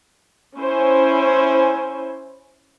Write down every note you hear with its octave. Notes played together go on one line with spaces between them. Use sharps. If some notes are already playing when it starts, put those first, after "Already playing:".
C#4 E4 C5 G#5